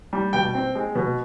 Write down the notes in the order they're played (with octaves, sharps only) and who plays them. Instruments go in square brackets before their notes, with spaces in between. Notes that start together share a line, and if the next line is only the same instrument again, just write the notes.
[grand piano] G3
B2 G5
C4
G#3
B2